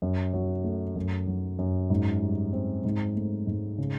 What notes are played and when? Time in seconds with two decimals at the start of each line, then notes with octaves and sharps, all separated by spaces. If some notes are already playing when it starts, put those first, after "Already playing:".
0.02 F#2
0.33 F#3
0.64 A3
0.96 F#2
1.27 F#3
1.59 F#2
1.90 G#2
2.22 G3
2.53 C4
2.85 G#2
3.16 A3
3.47 G#2
3.78 C#3